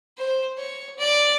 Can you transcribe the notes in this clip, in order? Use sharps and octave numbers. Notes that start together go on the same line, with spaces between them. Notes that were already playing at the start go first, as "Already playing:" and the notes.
C5
C#5
D5